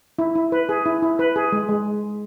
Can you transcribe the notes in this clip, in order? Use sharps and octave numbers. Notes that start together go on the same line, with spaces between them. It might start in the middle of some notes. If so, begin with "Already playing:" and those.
E4
E4
B4
G#4
E4
E4
B4
G#4
G#3
G#3